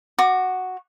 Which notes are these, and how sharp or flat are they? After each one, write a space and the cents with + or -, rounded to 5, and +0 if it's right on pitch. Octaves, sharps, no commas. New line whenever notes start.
F#4 +0 D6 +25